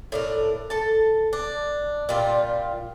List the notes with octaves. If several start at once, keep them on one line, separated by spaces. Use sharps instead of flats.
A2 D4 A#4
A4 A5
D4
A#2 G3 F4